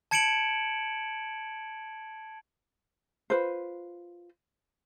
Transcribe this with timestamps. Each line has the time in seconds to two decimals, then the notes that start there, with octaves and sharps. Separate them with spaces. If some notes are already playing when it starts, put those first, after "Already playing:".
0.11 A5 G#6 C#7 D7 E7 F#7
3.30 F4 B4 C5